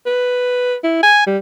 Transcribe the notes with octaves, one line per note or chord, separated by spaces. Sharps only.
B4
E4
G#5
G3